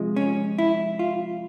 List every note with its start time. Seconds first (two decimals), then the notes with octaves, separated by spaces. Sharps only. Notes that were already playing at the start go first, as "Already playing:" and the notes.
Already playing: C3 F3 G#3
0.16 C#4
0.58 E4
0.99 F4